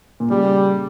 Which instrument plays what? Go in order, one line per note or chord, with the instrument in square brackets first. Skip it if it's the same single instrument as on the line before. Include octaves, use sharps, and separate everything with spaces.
[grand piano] A#2
[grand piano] C#3 [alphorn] G3